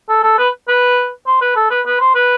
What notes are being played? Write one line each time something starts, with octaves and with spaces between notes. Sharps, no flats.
A4
A4
B4
B4
C5
B4
A4
B4
B4
C5
B4